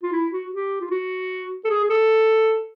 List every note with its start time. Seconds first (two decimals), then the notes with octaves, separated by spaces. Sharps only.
0.03 F4
0.12 E4
0.32 F#4
0.52 G4
0.81 F4
0.91 F#4
1.65 A4
1.70 G#4
1.84 G#4
1.90 A4